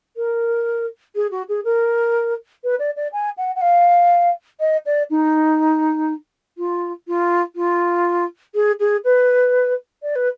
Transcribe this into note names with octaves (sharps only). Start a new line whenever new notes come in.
A#4
G#4
F#4
G#4
A#4
B4
D5
D5
G#5
F#5
F#5
F5
D#5
D5
D#4
F4
F4
F4
G#4
G#4
B4
D5
B4